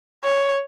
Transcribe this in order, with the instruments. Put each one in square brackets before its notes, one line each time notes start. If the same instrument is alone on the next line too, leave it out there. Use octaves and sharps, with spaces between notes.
[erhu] C#5